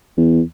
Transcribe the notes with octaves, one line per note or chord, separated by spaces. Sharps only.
E2